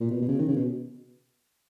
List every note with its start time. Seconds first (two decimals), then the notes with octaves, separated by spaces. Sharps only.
0.01 A#2
0.11 B2
0.22 B2
0.28 C#3
0.39 D#3
0.48 C#3
0.56 B2